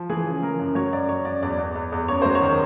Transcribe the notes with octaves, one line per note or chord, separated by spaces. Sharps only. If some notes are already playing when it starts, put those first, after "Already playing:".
Already playing: F3
E3 G#4
C#3
E3 A#4
F#2
F#3 C#5
F#2 D5
F#2 C#5
F#2 D5
E2 D5
E2
E2
E2
F#2 C#5
F#3 C5
C#5
D#3